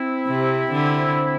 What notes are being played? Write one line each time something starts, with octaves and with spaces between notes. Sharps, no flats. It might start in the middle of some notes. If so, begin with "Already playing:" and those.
Already playing: C4 E4
C3
D3